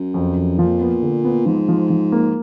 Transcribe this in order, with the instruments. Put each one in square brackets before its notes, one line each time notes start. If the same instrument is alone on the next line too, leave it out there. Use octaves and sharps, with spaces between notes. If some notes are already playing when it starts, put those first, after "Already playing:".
Already playing: [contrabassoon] F#2
[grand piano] F2
F2
[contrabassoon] A#2 [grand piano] F3
[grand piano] B3
D3
B3
[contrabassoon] G#2 [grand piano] F3
[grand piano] F3
F3
A#3